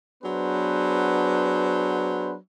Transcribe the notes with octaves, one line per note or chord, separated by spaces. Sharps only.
F#3 B3 D4 G#4 B4 C5